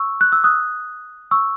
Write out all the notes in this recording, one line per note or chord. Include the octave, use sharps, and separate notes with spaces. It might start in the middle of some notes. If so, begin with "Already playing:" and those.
Already playing: C#6 E6
F#6
E6
D#6 F#6
C#6 E6